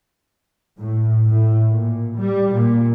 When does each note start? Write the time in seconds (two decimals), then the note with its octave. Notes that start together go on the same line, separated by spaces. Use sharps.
0.79 A2
1.27 A2
1.69 A#2
2.16 G3
2.52 A#2